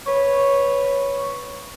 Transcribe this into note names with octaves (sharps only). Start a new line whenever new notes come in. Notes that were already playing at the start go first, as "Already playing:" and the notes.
B4 C#5